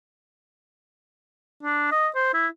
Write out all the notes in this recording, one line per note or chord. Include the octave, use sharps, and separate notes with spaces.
D4
D#5
C5
E4